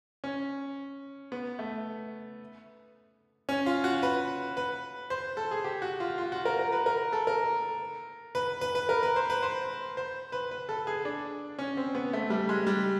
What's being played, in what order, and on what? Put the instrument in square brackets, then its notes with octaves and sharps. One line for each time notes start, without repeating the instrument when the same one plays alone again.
[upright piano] C#4
B3
A3
C#4
F4
F#4
B4
B4
C5
A4
G#4
G4
F#4
F4
F4
F#4
A#4
A#4
B4
A#4
A4
A#4
B4
B4
B4
A#4
B4
C5
B4
C5
C5
B4
B4
A4
G#4
D4
C#4
C4
B3
A3
G3
G#3
G3